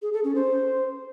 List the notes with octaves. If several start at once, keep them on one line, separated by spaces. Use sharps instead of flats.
G#4
A4
C#4
C5